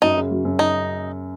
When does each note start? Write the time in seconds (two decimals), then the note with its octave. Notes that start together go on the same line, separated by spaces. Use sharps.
0.02 F#2 D#4
0.17 C#3
0.31 F#3
0.45 F#2
0.59 D#4